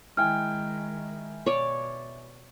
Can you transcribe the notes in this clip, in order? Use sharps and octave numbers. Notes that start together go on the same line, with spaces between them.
D#3 G#3 E4 G5 G#5 F6
B2 C#5 D5